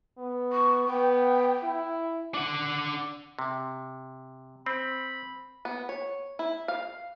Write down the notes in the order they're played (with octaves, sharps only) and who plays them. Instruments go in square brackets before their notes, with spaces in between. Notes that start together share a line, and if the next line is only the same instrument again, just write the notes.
[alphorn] B3
[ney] C#6
[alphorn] B3 [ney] G5
[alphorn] E4
[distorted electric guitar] D4 F#5
[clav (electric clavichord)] C3
[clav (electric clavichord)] C4 [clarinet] B5
[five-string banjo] B3
C#5
E4
F5